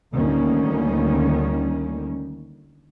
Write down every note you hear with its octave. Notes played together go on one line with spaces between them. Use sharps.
D2 D#3 G3 A#3 C#4